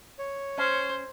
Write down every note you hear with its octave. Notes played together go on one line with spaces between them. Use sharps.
C#5
C#4 C5